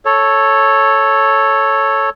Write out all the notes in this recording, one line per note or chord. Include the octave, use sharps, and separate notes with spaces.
A4 C#5